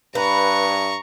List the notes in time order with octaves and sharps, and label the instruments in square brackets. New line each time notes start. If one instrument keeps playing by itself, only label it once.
[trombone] G2 [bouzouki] B4 [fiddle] A#5 C#6